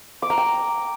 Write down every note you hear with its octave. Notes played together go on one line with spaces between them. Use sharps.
D6
A#5
G5